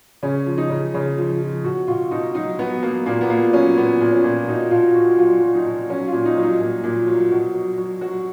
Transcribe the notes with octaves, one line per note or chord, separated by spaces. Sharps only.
C#3 C#4
F3
D#4
C#3
C#3
F3
F3
B2 F#4
B2 F4
B2 D#4
F#3 D#4
F#3 B3
F#3 A#3
A#2 A#3
B3
A#2 A#3
F#3 C#4
A#2 B3
A#2
C#4
A#2
B2 D#4
B2 F4
B2 F#4
F#3 F4
F#3
D#4
B2
F#3 C#4
F4
A#2
D#4
F#3
D#4
A#2
A#2
F#3
B2
F#3
F#3
F#3 F#4